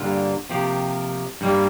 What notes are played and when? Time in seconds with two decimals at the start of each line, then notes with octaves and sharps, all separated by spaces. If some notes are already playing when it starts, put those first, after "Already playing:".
Already playing: G2 D3 A#3 F4
0.50 C3 F3 A#3 G4
1.41 G2 G3 A#3